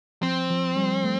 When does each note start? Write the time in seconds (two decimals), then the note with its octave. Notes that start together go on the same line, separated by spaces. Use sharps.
0.22 F3 C4
0.50 F3
0.76 G3
1.04 A3